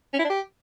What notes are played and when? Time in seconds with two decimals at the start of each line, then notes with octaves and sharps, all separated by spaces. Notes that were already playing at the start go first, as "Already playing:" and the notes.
0.14 C#4
0.19 E4
0.24 D4
0.30 G4